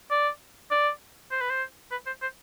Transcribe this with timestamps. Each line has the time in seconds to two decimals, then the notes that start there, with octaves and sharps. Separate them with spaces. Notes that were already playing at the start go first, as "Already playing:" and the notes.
0.11 D5
0.71 D5
1.31 C5
1.41 B4
1.50 C5
1.91 B4
2.06 C5
2.22 C5